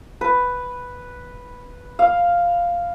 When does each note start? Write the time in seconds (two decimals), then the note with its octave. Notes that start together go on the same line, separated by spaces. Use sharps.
0.21 B4
1.99 F5